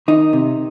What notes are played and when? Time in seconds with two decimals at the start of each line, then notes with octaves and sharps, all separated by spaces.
0.08 D#3 D#4
0.33 C3